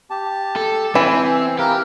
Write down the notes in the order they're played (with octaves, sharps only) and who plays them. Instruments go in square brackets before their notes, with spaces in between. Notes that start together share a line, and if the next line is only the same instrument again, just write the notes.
[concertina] G4 A5
[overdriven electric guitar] A4
[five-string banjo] E3 [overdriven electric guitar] C4 [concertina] E5 G#5
[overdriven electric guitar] G4 [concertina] A#4 B4 F5